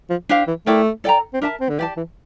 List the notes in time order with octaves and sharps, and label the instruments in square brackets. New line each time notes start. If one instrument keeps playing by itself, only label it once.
[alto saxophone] F3
[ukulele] D4 G4 C5 F5
[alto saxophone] E3
[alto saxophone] A3 [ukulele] E4 A#4 D5 G5
[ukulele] A4 D5 G5 A#5
[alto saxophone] C4
[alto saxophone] D4 [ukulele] A#4 E5 A5
[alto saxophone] C4
D3
[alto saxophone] E3 [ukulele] G4 D5 A5
[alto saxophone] E3